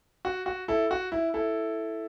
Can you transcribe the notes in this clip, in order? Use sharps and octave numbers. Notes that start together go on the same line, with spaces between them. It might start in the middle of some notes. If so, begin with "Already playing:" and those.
F#4
F#4
E4 A4
F#4
E4
E4 A4